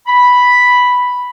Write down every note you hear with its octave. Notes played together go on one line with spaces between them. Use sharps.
B5